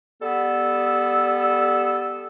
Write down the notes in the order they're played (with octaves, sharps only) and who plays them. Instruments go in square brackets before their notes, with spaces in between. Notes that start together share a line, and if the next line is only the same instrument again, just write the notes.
[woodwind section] G3 B3 A4 E6